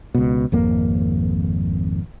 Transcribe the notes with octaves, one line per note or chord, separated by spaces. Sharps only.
C#2 B2
G#1 F2 A#3